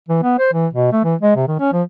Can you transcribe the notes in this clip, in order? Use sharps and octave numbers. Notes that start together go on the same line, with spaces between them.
E3
B3
C5
E3
B2
A3
E3
G#3
C3
D#3
C#4
F3